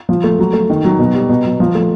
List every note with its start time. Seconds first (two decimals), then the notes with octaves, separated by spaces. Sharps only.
0.09 F3
0.24 A3
0.39 F#3
0.53 A3
0.70 D#3
0.85 F#3
0.99 B2
1.15 G3
1.29 B2
1.45 F#3
1.60 F3
1.75 A3